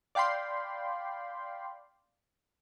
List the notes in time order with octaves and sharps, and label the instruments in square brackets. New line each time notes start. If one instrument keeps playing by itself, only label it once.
[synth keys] D5 F5 G5 B5 C6